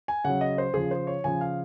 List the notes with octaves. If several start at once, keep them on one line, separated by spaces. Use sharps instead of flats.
G#5
C#3 F#3 F#5
D#5
C5
C#3 F3 G#4
C5
C#5
C#3 F3 G#5
F5